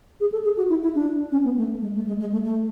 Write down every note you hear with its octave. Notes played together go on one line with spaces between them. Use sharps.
G#4
A4
G#4
F#4
E4
E4
D4
C#4
B3
A3
G#3
A3
G#3
G#3
A3
A3